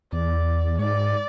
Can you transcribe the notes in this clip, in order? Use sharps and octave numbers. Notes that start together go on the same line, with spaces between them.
E2 D5
G#2 D5